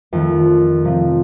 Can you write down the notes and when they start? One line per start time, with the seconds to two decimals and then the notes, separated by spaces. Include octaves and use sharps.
0.13 F2 D#3 A3
0.84 C3 F3 C4